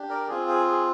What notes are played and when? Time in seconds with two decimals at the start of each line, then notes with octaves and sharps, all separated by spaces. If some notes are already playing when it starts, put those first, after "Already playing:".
Already playing: D4 G4
0.09 A#4 D5
0.28 C4 F4 G#4
0.48 G#4
0.66 G#4